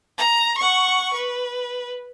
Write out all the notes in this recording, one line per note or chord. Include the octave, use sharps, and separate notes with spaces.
A#5
F#5 C#6
B4